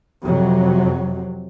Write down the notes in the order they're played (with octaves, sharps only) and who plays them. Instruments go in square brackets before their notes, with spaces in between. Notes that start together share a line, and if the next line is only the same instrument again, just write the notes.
[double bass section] F2 C3 F#3